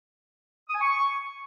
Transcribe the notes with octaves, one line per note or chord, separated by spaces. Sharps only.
D#6
G#5
C#6